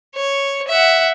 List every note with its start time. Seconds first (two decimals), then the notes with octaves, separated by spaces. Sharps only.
0.16 C#5
0.68 E5 F#5